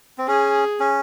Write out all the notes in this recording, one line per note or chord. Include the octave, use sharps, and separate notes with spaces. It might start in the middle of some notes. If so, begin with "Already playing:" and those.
C4
C#4 G#4
C#4